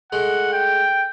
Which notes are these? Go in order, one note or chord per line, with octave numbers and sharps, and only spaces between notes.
G#3 A3 F#5
G5